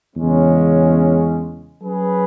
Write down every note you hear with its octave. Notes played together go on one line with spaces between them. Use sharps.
E2 C#3 G#3 C#4
F#3 C#4 G#4 B4